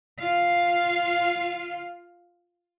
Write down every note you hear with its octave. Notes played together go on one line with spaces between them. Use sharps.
F4 F5